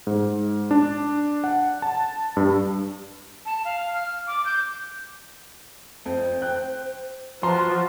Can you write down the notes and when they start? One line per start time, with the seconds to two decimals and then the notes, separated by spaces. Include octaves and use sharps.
0.07 G#2
0.71 D4
1.44 F#5
1.82 A5
2.37 G2
3.46 A5
3.65 F5
3.94 F6
4.27 D6
4.46 G6
6.06 F2 C5
6.42 G5 F#6
7.43 F3 F#4 B4 A5 A#5 C6